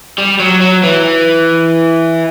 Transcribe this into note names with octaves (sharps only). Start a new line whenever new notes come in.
G3
F#3
F#3
E3